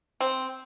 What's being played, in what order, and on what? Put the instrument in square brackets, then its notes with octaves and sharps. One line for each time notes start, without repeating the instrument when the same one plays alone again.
[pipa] C4